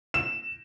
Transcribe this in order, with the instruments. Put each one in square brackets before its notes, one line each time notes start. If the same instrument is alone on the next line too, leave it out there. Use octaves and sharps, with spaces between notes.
[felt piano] E7